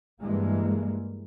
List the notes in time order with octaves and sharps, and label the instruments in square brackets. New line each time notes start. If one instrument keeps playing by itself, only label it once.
[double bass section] G2 E3 G#3 A#3